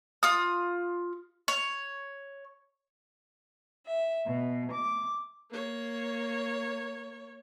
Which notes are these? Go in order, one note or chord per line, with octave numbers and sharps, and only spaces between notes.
F4 D#6
C#5
E5
B2
D6
A#3 C#5